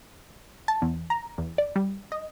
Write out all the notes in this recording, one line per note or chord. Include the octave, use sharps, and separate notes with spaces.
A5
E2
A#5
E2
D5
G3
D#5